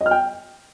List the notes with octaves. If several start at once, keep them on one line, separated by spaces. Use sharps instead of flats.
D#5
F6
G5